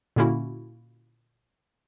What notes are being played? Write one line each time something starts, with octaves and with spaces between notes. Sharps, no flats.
A#2 D3 A#3 C#4 E4 F#4